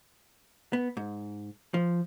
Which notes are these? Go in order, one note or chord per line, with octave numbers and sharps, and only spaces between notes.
B3
G#2
F3